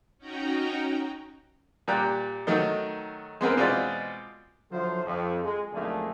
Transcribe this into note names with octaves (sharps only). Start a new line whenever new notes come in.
C#4 D#4 F#4 G5 A#5
A#2 G3 D5 G5 A#5 F#6
D#3 F#3 A3 D#4
G#3 B3 C4 A#4
B2 G#3 B3 C4 F4 D5
D3 F3 F#3 E4 F4 C5
F2
G#3
B1 F2 D3 A3 A#3 G#4